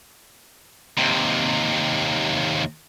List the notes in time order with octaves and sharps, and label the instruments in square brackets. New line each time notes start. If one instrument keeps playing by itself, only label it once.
[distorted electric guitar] D#2 C3